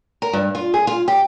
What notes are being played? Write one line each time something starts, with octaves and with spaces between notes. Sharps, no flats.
A#4
G2
F4
G#4
F4
G4